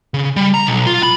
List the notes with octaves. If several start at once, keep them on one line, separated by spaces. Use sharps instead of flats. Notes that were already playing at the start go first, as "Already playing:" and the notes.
C#3
G3
A#5
B1
F4
B5